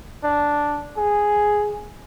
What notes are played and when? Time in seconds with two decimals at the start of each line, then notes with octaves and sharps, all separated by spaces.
0.24 D4
0.97 G#4